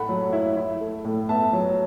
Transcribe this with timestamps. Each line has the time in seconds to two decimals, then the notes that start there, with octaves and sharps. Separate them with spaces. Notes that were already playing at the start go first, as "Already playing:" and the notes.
Already playing: A2 A3 F#5 B5
0.09 F#3
0.33 E4
0.56 E4
0.81 A3
1.04 A2
1.29 B3 E5 A5
1.53 F#3